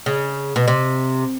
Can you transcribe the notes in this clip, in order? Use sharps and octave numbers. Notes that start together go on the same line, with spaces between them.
C#3
B2
C3